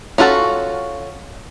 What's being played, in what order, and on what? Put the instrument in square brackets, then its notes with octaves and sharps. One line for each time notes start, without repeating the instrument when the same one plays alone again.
[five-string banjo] C#4 F4 F#4 A4